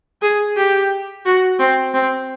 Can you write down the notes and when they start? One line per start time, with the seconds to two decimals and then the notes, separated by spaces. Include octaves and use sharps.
0.22 G#4
0.57 G4
1.25 F#4
1.59 C4
1.94 C4